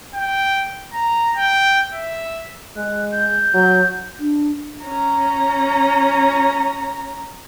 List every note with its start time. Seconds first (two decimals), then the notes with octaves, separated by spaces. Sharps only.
0.15 G5
0.93 A#5
1.36 G5
1.94 E5
2.76 G#3 F#6
3.12 G6
3.54 F#3
4.20 D4
4.83 C#4 A#5